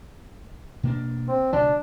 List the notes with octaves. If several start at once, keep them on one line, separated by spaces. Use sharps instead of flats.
B2 A#3 D4
C4
C#2 B2 F3 D4